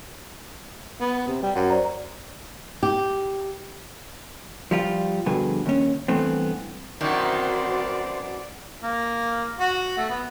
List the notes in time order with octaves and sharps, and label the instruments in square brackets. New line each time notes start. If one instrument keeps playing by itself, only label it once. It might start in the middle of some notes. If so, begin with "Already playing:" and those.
[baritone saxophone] B3
C3
G3
[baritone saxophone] F#2 [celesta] F#5
[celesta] C5 D5 A#5
[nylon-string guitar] G4
[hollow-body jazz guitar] F3 G3 F4
G2 B2 D3 F3 G#4 B4
D#2 C#4
G2 E3 A3 B3 C4
[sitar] F#2 B2 E3 [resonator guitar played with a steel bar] D#3 [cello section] C4 F#4 C5 [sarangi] D5
[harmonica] A#3
F#4
A3
B3